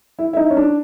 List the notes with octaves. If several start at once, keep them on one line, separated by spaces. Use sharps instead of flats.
E4
E4
D#4
C#4
D4